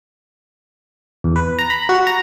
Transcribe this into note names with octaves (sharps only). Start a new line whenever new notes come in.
E2
B4
A#5
B5
F#4
A#5